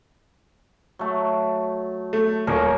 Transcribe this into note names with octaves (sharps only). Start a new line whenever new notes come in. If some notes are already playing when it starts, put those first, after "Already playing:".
F#3 A3
A3
D#1 A#4 C#5